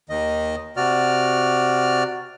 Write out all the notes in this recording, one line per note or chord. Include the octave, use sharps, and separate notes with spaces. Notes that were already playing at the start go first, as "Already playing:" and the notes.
D#2 D#3 D#5
C3 F#4 D5 F6